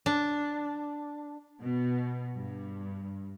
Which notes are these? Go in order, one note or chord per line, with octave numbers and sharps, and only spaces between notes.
D4
B2
G2